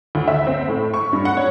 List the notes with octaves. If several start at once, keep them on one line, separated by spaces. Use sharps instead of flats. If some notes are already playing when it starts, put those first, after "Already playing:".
D2
E5
C4
A2
C#6
G2
F#5
C#5